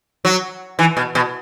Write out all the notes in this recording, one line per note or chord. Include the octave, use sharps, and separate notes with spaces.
F#3
E3
B2
B2